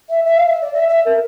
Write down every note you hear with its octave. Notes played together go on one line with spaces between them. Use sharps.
E5
E5
F5
E5
D5
E5
E5
A#4